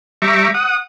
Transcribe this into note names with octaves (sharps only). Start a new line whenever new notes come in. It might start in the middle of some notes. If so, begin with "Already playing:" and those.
G3 E5 A#5 C#6 D6
F#5 D#6